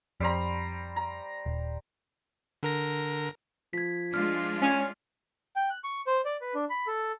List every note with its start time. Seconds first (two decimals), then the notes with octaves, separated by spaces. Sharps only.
0.20 F2 G3 C5 A#5
0.96 A#5
1.46 D#1
2.63 D3 A#4 A#6
3.73 F3 G#6 B6
4.14 G#3 D4 F4 F6
4.61 C#4
5.56 G5
5.70 F#6
5.84 C#6
6.07 C5
6.25 D5
6.41 B4
6.55 D4
6.70 B5
6.87 A4